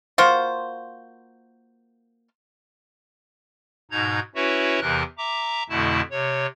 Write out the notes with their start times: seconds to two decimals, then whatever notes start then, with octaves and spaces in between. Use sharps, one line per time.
0.18 A#3 F4 F#4 C5
3.91 G#2 B2 D#4 A#5 G#6
4.35 C#4 E4 F#4 B4 C#5 E5
4.81 E2 C3 E3 A#4 F#6
5.18 E5 A#5 D6
5.69 F2 B2 D3 A3 E4 A5
6.11 C3 C#5